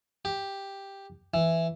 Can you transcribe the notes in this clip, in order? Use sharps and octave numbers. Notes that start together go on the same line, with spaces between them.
G4
E3